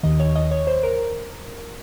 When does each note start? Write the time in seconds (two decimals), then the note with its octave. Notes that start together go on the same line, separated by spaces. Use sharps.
0.03 D#2 D#3 D#5
0.20 C#5
0.35 D#5
0.51 C#5
0.67 C5
0.83 A#4